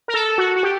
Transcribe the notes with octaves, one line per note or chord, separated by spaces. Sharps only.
A#4
A4
F#4
F#4
G4